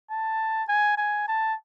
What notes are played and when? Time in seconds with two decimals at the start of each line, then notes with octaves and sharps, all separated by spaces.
0.10 A5
0.68 G#5
0.98 G#5
1.28 A5